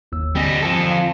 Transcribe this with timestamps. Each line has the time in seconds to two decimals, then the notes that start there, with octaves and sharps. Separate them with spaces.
0.12 G1 D#2 E6
0.35 D3 G3 C4 D#5 G#5
0.62 F3 A4
0.91 F5